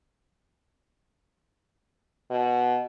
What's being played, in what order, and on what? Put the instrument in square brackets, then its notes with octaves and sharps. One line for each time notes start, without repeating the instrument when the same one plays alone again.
[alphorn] B2